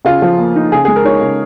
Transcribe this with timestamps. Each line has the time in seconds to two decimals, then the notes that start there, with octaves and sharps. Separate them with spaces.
0.05 C#3 F4
0.22 F3
0.39 A#3
0.56 D#4
0.72 C#3 G#4
0.85 G#3 G#4
0.96 A#4
1.05 D#4 C#5
1.21 C#3